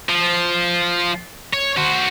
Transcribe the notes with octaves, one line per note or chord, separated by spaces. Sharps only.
F3
C#5
F#4 C5